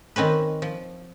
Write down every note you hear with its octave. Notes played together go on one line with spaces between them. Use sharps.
D#3 C4 C#4 B4
F3